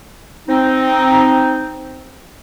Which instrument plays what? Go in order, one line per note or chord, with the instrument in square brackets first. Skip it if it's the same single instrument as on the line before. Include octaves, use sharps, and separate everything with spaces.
[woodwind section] C4 D#4